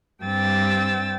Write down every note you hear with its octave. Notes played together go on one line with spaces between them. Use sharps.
G2 G3 C4 G5 E6 A6